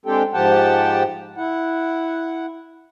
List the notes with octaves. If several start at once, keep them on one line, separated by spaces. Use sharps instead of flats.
G#3 C4 D4 G4 A4 G5
G#2 F3 G4 F#5 G5 A5
E4 F#5